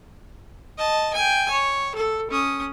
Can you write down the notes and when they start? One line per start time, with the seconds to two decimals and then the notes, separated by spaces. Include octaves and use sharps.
0.78 D#5 A5
1.14 G5 G#5
1.50 C#5
1.95 A4
2.31 C#4 D#6